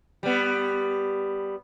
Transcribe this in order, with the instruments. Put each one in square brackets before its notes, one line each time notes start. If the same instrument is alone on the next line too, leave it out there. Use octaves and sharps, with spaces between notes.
[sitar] G3 B3